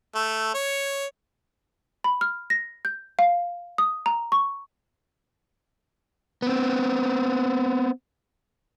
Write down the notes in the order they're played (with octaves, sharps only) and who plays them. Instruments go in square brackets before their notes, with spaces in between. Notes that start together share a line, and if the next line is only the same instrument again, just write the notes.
[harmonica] A3
C#5
[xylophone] B5
F6
A#6
G6
F5
D#6
A#5
C#6
[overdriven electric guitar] B3 C4